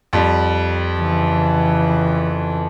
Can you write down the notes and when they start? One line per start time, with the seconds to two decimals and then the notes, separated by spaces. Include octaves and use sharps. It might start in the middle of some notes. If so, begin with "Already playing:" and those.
0.13 F2 G3
0.97 C#3 E3